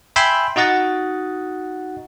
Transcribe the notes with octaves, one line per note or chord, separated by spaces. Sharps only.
E5 G5 G#5 B5 C6 E6
D#4 F#4 D#5 F#5 D#6 A6